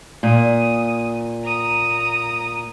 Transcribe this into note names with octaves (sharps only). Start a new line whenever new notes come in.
A#2 D#6
A#5 D#6